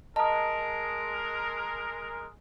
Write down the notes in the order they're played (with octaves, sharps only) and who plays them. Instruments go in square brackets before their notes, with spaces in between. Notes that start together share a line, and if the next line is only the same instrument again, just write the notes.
[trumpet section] G#3 A#4 [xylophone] D#5 A#5 [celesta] A5 D#6